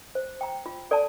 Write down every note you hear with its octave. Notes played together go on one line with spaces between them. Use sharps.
C5
G5 A#5
F4
A4 D5 A5